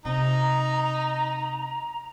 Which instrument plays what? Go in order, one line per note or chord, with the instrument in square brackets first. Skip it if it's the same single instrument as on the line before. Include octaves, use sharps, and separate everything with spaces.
[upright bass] C3 [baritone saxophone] D#4 [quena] A#5